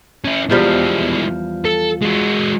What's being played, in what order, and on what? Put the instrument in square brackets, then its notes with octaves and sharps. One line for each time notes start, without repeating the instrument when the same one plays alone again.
[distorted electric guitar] C#4 E4
[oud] E2 F3 G3 [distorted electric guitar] E3 G#3
[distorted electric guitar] A4
G#3 F#4